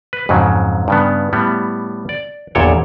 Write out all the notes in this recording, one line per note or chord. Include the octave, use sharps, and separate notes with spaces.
B4
F2 G#2 C#3 F#3
G2 C#3 B3
A2 G3 B3
D5
G1 E2 A#2 A4 C#5 G5